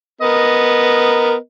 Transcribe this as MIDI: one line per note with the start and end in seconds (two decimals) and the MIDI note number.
0.21 1.35 59
0.21 1.35 70
0.21 1.35 75